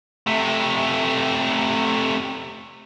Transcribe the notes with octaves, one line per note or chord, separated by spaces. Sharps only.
C3 A3